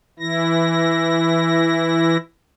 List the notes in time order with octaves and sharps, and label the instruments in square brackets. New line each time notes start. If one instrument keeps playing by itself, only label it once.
[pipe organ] E3 E4 A#6